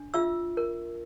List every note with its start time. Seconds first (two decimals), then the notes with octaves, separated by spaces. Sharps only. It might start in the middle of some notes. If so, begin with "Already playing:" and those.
Already playing: D4
0.14 F4 E5 E6
0.57 A#4